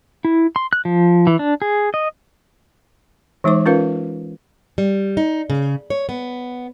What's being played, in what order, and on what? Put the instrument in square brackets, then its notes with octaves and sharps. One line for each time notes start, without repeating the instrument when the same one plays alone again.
[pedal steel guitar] E4
C6
F#6
F3
E3
D4
G#4
D#5
[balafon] E3 G#3 D#4 C5 D6
C#4 F4 A#4 B4 F5
[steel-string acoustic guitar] G3
D#4
C#3
C#5
B3